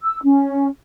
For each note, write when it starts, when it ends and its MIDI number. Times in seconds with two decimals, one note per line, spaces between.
0.01 0.18 88
0.24 0.67 61